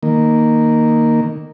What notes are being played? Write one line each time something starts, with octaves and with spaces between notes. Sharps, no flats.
D#3 A#3